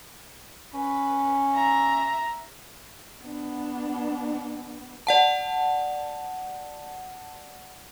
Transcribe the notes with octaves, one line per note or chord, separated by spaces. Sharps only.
C#4 B4
E5 A#5
B3 D4
D5 F#5 A5